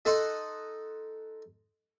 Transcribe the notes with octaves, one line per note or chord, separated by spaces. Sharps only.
D#4 A4 D#5 F#5 C6